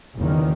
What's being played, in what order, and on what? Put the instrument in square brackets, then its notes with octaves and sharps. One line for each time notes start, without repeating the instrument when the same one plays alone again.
[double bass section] F#1 E2 D#3